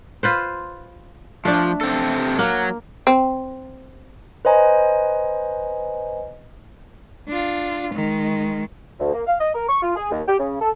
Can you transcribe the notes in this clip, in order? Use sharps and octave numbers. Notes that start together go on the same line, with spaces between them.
F4 B4 C5
F3 A3 D4
C3 C4 A4
F#3 A#3
C4
B4 C5 D#5 G#5 A#5
D4 F4
D#3 G#3
D2
A#3
F5
D#5
A#4
C#6
F4
G#4
D#2
G4
C#3
A4